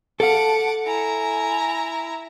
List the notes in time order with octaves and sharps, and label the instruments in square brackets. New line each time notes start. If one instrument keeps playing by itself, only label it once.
[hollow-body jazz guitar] A4 F5 [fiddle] F#5 D6 [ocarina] A5
[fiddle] E4 A#5 [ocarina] G#5